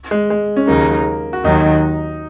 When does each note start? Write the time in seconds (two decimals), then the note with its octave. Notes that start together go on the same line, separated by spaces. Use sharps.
0.11 G#3
0.30 G#3
0.57 C#4
0.68 D#2 C#3 F#3 A#3 D#4
1.33 F#4
1.44 D#2 D#3 F#3 D#4